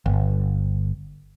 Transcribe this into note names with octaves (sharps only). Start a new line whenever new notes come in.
G1